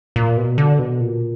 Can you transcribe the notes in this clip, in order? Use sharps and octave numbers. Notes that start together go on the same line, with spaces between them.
A#2
B2
D3
B2
A#2